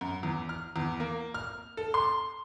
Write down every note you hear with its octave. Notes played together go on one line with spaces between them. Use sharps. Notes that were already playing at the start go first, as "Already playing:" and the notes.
F#2
E2
F6
E2
A#3
F6
A4
C6